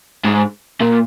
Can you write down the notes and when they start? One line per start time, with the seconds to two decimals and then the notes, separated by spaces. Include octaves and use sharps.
0.25 G#2
0.80 A#2